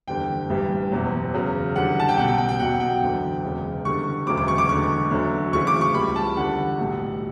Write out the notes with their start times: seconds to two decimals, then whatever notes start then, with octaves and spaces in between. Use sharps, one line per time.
0.08 F#1 E2 D3 G3 G5
0.50 A1 G2 E3 G3
0.92 F#1 E2 B2 F#3
1.34 E2 C#3 F#3
1.75 E2 D3 G3 F#5
2.00 A5
2.09 G5
2.17 B1 B2 G3 F#5
2.28 G5
2.38 G5
2.49 G5
2.59 B1 B2 F#3 F#5
2.80 G5
3.01 F#1 E2 D3 F#3
3.44 E1 E2 C#3
3.85 E2 D3 G3 C#6
4.27 E1 D2 C#3 F#3 D6
4.37 D6
4.48 C#6
4.58 D6
4.69 E1 E2 D3 C#6
5.11 D2 D3 F#3
5.53 D2 C#3 E3 C#6
5.67 D6
5.81 C#6
5.94 C#2 C#3 G3 B5
6.16 A5
6.37 E2 D3 G3 F#5
6.79 B1 A2 G3